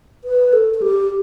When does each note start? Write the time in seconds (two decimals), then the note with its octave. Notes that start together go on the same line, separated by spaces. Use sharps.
0.24 B4
0.53 A4
0.74 A4
0.82 G4